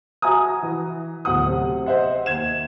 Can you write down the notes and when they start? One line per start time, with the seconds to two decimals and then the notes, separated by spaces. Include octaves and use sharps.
0.22 F#4 E5 G#5 A#5 D#6
0.63 E3
1.25 D1 B2 F#5 D#6
1.46 C3
1.86 C5 D#5 E5 F#5
2.26 D#2 G#6 E7